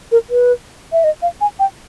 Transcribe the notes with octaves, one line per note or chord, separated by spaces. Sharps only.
A#4
B4
E5
D#5
F5
G#5
G5